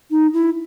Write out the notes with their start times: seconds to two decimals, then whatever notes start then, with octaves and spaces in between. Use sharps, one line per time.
0.11 D#4
0.33 E4